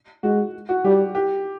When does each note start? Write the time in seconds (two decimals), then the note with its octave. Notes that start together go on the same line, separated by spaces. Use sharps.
0.23 G#3 F#4
0.69 F#4
0.84 G3 G4
1.15 G4